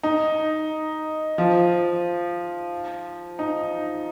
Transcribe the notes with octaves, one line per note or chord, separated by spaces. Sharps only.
D#4
F3
D#4